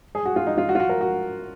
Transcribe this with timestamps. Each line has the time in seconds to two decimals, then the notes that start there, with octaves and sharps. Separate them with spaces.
0.15 G#4
0.26 F#4
0.36 F4
0.47 D#4
0.58 F4
0.69 F#4
0.75 F4
0.80 F#4
0.89 A#4
1.01 F#4